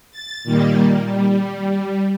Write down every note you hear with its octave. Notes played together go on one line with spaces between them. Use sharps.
A6
A#2 D#3 G3 A#3
G3